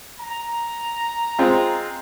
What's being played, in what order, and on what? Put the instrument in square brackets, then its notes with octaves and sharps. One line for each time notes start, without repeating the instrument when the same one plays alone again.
[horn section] A#5
[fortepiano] G#3 C4 F4